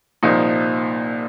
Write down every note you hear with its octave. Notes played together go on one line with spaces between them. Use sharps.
C2 A#2 F3 D#4